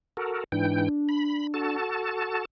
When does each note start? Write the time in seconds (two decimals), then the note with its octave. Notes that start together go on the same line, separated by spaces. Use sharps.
0.17 F#4 A4 A#4
0.52 G#2 E3 D4 G5
1.09 B5
1.54 F#4 A4 A5